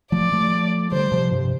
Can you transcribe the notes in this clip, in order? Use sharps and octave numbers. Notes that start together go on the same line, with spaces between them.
F3 A3 D5
F3 A3
D3 G3 C5
C3 F3
G2 C3